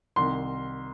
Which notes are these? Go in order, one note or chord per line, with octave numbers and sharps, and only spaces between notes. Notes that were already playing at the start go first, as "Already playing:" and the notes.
C2 C3 D#3 C6